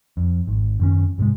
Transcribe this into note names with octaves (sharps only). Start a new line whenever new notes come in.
F2
G#1
F#2 D#3 C#4
C2 G#2 C3 G#3